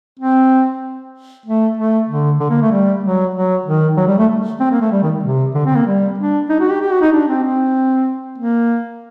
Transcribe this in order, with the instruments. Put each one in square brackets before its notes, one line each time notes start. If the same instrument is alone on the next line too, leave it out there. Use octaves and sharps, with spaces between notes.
[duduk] C4
A3
A3
D3
D3
A#3
A3
G3
F#3
F#3
D#3
F#3
G3
A3
C4
A#3
A3
G3
D#3
C3
D3
C4
A#3
G3
D4
D#4
F#4
G4
G4
F#4
D#4
D4
C4
C4
A#3